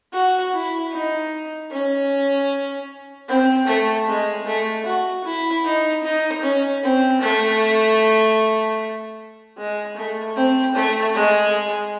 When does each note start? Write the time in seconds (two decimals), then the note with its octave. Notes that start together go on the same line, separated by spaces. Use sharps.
0.13 F#4
0.52 E4
0.92 D#4
1.71 C#4
3.28 C4
3.67 A3
4.07 G#3
4.46 A3
4.85 F#4
5.25 E4
5.64 D#4
6.03 D#4
6.42 C#4
6.83 C4
7.21 A3
9.57 G#3
9.96 A3
10.36 C4
10.75 A3
11.15 G#3